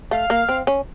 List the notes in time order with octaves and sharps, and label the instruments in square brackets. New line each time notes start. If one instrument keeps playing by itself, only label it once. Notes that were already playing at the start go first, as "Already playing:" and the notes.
[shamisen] A3 [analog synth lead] F5
[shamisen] A#3
C4
C#4